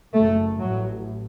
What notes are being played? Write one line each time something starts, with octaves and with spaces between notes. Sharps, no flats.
F#1 F#2 A3
A1 A2 F#3